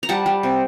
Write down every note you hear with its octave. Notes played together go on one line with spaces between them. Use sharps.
A#5
G3 F#5 A5
G3
C3